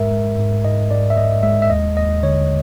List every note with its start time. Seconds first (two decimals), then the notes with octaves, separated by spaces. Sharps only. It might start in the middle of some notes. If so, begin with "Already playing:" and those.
Already playing: G#2 G#3 A#4 E5
0.11 G#3
0.38 G#2
0.64 G#2 D#5
0.90 G#2 D5
1.10 E5
1.17 G#2 D#5
1.43 G#3 E5
1.62 E5
1.70 D#2 D#5
1.96 D#2 D#5
2.23 D3 C#5